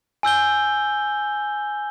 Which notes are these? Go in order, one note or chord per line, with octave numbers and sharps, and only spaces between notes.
G#5 E6 G6 G7